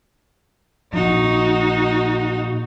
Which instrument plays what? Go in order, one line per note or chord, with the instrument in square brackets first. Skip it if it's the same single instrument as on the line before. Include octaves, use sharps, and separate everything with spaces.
[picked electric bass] A#2 F3 [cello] D#4 F#4